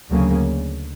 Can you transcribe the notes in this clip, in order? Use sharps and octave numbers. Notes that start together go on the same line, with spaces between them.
D2 C#3 F#3 A#3 C#4